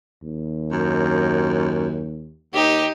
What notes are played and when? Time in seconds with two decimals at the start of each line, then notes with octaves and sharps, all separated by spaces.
0.22 D#2
0.71 F#2
2.54 D#2 D#4 G4